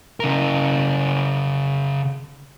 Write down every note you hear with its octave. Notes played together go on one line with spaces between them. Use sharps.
C#3 A#4